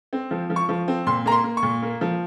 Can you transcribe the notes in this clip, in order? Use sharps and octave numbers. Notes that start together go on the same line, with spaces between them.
C4
F3
F3
C#6
F3
C4
A#2 C6
A#3 A#5
C6
A#3
C#6
A#2
A#3
F3